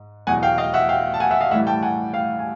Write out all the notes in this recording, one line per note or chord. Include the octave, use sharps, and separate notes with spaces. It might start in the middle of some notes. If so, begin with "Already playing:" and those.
Already playing: G#2
E2 B2 F#3 F#5 G#5
F5 G5
D#5 F5
E5 F#5
F5 G5
A5
F#5 G#5
E5 F#5
D#5 F5
A2 E3 G3 E5 F#5
G5 A5
F#5 G#5
F5 G5
G#5